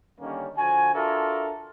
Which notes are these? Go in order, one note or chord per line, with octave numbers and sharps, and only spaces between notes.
D3 D#3 G3 A#3 C#4
D3 F3 F#4 G#5
D4 F4 F#4 A4 A#4 E5